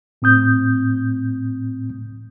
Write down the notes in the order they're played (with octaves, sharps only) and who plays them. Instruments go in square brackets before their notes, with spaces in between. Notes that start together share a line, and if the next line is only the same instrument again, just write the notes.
[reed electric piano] A2 C4 D#6 G6